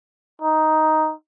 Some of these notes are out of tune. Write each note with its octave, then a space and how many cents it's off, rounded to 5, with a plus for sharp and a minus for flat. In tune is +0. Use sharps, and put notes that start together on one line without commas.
D#4 +5